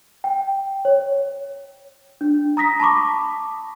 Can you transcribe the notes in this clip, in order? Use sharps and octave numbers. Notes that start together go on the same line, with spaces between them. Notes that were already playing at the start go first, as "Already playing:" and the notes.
G5
C#5
D4
A#5 D#6 A#6 B6
A5 B5 C#6 D6